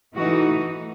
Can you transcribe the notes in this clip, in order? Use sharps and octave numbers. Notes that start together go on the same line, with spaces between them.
E3 A3 D#4 F#4